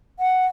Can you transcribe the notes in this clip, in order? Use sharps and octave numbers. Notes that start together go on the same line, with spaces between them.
F#5